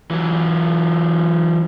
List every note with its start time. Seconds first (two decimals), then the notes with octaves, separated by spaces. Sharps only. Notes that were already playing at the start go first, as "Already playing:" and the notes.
0.11 E3 F#3